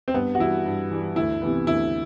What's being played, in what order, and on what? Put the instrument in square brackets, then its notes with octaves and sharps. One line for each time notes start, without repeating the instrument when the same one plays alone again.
[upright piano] C4
[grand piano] G2 [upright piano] B3
[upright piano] F#4
[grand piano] E3 G3 [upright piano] E4
[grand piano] G2
E3 G3
[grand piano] D2 [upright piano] E4
[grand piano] C3 E3 B3
[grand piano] D2 [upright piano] E4